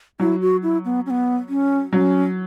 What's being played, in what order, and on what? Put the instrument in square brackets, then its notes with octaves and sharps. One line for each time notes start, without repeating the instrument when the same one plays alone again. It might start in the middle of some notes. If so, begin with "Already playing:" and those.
[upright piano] F#3 [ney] E4
[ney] F#4
E4
B3
C#4
B3
C#4
[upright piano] F#3 [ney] C#4